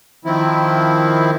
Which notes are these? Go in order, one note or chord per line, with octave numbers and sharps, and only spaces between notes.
D#3 F3 C4 E4